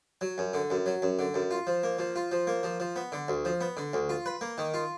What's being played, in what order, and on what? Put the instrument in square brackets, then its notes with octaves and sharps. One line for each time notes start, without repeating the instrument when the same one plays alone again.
[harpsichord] F#3
F#2
D3
F#2
F#3
F#2
D3
F#2
F4
F3
A#3
F3
F4
F3
A#3
F3
F3
B3
D3
D2
F3
B3
D3
D2
F4
B4
A#3
D#3
F4